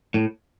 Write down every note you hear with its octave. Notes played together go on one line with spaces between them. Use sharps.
A2